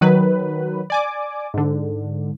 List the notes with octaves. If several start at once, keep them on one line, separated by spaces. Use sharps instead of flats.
D#3 F#3 B4
D5 G#5 D6
G#2 D3